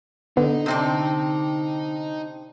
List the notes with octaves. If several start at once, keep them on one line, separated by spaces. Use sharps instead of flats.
D3 B3 D#4 D#5
C3 C4 D4